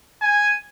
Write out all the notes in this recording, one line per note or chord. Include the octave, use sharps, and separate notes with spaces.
G#5